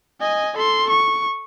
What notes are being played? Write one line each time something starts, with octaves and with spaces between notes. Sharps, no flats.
D#5 G#5
A4 C6
C#6